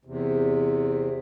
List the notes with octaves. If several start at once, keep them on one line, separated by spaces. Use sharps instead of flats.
E2 C3